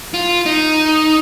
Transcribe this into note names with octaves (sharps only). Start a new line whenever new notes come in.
F4
D#4